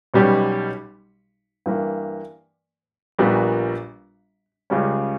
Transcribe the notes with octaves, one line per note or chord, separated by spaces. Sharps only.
B1 B2 G3 C#4 G4
G2 E3 A#3
A#1 A#2 G3 B3 F#4
C#2 C#3 G3 C#4